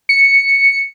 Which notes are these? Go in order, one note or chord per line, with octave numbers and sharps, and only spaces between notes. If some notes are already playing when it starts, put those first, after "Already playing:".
C#7